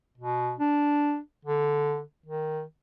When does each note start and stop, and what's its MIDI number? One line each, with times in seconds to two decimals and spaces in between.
0.18 0.53 47
0.59 1.18 62
1.45 2.01 50
2.26 2.62 51